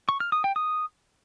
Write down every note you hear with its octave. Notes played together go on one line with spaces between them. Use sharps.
C#6
F6
D#6
G5
D#6